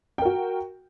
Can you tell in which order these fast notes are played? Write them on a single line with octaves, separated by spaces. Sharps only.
G5 A#4 F#4